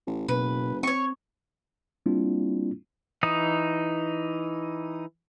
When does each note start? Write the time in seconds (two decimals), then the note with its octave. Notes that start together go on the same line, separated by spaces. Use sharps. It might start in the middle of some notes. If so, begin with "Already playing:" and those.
0.07 A1
0.29 F#1 B2 B4
0.83 C4 C#5 C#6
2.06 G3 A#3 C4 D4 E4 F4
3.23 E3 D#4 D#6